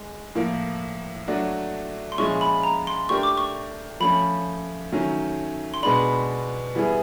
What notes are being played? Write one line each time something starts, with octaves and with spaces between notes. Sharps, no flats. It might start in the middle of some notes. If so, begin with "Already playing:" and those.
Already playing: G#3
A2 F3 A#3
F#3 A3 D4 F#4
C6
A#2 F3 G#3 C#4 E4 C#6
B5
A#5
C6
A3 D4 G4 A#4 C#6
D6
C#6
F3 A3 C#4 B5
D#3 F#3 A3 C#4
C6
B2 G#3 B3 D4 B5
E3 G3 B3 E4 G#4